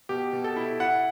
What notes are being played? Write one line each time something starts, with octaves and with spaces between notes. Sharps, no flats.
B2 G4
B2
A4
E4
E4 F#5